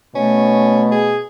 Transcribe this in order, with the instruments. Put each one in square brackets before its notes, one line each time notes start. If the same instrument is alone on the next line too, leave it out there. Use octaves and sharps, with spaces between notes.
[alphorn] B2 [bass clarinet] A3 [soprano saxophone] C#4
[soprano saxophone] G#4